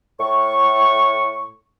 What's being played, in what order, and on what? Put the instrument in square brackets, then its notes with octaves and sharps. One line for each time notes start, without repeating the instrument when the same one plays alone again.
[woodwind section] A2 C#6